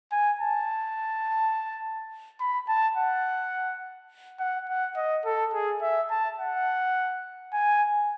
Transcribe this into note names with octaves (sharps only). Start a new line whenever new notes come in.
G#5
A5
B5
A5
F#5
F#5
F#5
D#5
A4
G#4
E5
A5
F#5
G#5